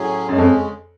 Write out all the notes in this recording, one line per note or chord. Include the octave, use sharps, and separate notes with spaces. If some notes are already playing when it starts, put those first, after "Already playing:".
Already playing: A2 F#3 C#4 G#4
F#2 C#3 G#3 C#4
F2